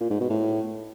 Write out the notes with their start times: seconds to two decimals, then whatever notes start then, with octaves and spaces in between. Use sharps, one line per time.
0.01 A#2
0.10 G#2
0.20 B2
0.30 A2